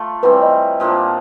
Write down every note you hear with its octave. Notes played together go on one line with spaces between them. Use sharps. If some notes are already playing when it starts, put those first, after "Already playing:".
Already playing: A3 F4
E3 G3 C4 B4
D5
D#5
A#2 F3 A#3 D4